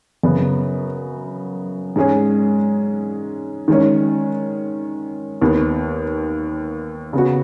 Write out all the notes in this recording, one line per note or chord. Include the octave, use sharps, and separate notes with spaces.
F#2 C#3 B3
G#2 G#3 C#4 G#4
D#3 G#3 C#4
D#2 D#3 B3
C#3 B3 F#4